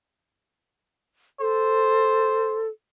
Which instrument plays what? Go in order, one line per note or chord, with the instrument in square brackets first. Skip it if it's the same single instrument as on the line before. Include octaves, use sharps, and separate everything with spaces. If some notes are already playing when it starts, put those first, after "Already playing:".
[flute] A4 [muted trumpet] C5